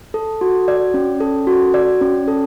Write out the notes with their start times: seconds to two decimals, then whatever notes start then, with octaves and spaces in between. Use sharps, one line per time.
0.14 A4
0.41 F#4
0.68 D5
0.94 C#4
1.20 A4
1.47 F#4
1.74 D5
2.01 C#4
2.28 A4